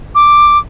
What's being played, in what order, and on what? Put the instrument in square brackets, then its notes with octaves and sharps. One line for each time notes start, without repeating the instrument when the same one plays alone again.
[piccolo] D6